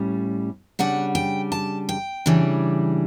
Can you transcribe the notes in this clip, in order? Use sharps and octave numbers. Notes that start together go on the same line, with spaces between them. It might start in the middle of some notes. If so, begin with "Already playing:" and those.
Already playing: A2 G3 C#4
C#3 G3 D4 F#5
G5
A5
G5
C#3 E3 G3 D4